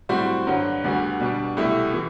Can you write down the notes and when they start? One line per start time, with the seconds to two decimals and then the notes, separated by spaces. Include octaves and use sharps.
0.09 A2 G3 C4 F#4 C5
0.47 G2 D3 F#3
0.84 D2 D3 G3 B3 F#4
1.20 B2 G3 D4
1.57 C2 B2 A3 E4 G4
1.94 E3